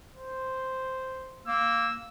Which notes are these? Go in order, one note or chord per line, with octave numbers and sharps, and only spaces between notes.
C5
A#3 E6